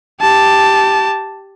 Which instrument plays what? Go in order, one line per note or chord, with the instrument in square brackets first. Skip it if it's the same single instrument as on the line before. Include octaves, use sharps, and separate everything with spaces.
[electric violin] G4 A5